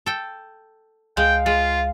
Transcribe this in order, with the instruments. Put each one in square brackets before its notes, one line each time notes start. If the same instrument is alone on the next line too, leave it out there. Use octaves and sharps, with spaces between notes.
[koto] A4 G5
[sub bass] C#2 [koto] G#3 [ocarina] F5 [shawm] G5
[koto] G#3 [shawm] F4